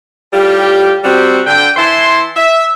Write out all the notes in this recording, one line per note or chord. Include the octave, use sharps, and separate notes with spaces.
A2 G3 F4 G4
C3 G3 C4 F#4 G4
D3 G5
E3 E4 A5 C6
E5